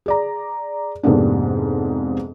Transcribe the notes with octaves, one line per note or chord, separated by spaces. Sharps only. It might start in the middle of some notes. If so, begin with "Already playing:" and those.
G#4 D5 A#5
F2 G#2 C3 A#3 B3 D4